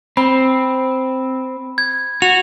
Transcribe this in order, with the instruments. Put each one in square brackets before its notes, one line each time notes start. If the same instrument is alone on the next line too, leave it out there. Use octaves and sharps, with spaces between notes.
[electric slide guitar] C4 [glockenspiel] B5
[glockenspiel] G#6
[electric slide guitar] F#4 [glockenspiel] F7